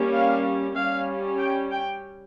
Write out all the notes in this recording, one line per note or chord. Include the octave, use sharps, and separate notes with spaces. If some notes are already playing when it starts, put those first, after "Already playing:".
Already playing: G3 A#3 C#4
F5
G3 C#4 F5
G5
G5